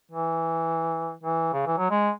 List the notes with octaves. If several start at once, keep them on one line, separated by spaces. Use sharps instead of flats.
E3
E3
C#3
E3
F#3
G#3